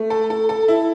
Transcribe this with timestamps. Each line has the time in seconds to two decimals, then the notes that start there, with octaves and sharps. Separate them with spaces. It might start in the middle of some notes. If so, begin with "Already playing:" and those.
Already playing: A3
0.10 A4
0.30 A4
0.49 A4
0.68 E4